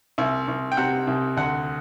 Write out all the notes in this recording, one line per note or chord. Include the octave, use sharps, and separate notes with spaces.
C2 E5
C2
G5
C3 F#5
C2
D2 F#5